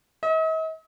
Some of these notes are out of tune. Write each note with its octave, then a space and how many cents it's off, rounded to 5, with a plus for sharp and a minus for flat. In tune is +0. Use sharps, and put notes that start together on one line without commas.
D#5 +45